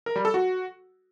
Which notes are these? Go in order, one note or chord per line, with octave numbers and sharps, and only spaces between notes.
A#4
G3
A4
F#4